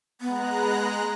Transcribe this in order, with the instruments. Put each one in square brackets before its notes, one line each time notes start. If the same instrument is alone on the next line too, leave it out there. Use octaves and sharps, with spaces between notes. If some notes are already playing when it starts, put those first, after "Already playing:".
[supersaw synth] G#3 A#5 F#6 [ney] B3